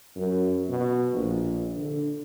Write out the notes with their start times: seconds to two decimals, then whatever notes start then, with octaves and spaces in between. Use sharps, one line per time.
0.16 F#2
0.69 B2
1.14 A#1
1.77 D3